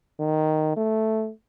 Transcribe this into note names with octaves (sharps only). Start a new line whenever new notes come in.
D#3
A3